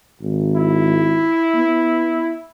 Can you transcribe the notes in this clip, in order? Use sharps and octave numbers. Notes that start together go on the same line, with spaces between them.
G#1
E4
B3